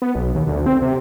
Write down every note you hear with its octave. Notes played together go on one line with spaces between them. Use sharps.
B3
B1
D#2
D2
C4
C3